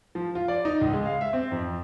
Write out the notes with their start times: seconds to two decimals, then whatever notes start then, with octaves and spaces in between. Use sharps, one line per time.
0.15 F3
0.35 F4
0.48 D5
0.65 D#4
0.81 C#2
0.93 G#3
1.05 F5
1.21 E5
1.33 C4
1.52 F2